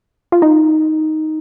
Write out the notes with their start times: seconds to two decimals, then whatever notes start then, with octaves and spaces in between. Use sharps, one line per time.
0.32 F4
0.42 D#4